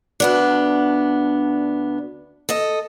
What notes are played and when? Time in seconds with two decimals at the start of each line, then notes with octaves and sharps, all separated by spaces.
0.20 D2 B3 D4
2.49 A4 D#5